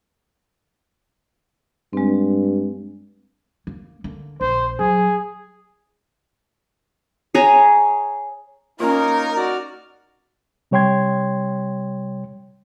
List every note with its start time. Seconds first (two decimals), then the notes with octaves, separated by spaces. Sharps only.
1.93 G2 G#3 C4
3.67 A#3
4.04 D3 A#3
4.41 A#1 C5
4.79 F#3 G#4
7.35 G#4 C#5 A#5
8.80 A#3 C#4 D#4 F4 A#4 C#5
9.36 F#4 D5 F6
10.71 C3 G3 C#5 G5 C6 G#6